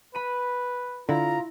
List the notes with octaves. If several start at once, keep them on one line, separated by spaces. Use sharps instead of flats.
B4 B5 D#7
D3 E4 F4 A#5